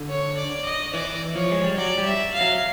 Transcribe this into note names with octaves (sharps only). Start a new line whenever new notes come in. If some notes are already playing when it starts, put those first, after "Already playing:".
Already playing: D3
C#5
D5
D#5
E3 D5
F3 C#5
G#3
G3
F#3 D5
G3
E5
F5
F#3